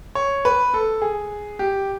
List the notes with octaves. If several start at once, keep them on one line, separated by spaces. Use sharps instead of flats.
C#5
B4
A4
G#4
G4